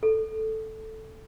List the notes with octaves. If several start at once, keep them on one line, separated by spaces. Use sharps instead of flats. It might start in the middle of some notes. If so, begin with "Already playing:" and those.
A4